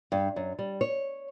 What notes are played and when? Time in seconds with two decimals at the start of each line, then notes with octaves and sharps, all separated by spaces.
0.12 G2
0.36 F#2
0.59 G3
0.81 C#5